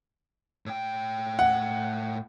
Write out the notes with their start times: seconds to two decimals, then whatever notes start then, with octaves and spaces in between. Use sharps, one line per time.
0.66 A2 G5
1.39 F#5